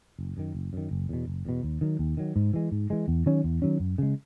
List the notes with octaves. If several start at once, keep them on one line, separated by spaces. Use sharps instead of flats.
F#1
F#2 D#3
F#1
F#2 D#3
F#1
E2 B2
F#1
E2 B2
D#2
D#3 F#3
D#2
D#3 F#3
G#2
E3 G#3
G#2
E3 G#3
E2
D#3 F#3 C#4
E2
D#3 F#3 C#4
F#2
C#3 G#3